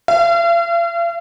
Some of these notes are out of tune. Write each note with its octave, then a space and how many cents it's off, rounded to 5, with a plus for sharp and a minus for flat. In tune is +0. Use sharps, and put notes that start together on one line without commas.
F5 -45